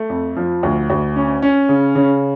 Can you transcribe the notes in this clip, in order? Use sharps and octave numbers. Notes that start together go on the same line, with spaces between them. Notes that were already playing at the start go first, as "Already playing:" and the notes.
Already playing: A3
F2
F3
D2
D2
C#4
C#4
C#3
C#3